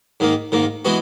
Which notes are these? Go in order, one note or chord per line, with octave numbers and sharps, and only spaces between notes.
G#2 D#3 A#3
G#2 D#3 A#3
E3 G#3 B3 F#4